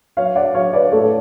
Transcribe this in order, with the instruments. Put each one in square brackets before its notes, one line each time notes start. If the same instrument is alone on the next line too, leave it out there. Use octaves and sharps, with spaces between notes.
[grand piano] F#3 C#5 F5
D5 F#5
F#3 C#5 F5
B4 D5
A2 A4 C#5